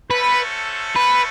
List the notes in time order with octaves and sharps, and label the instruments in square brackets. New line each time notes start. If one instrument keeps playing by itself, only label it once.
[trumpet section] A3 C#4 F#4 A4 C5 [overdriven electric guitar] B4
[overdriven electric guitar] B4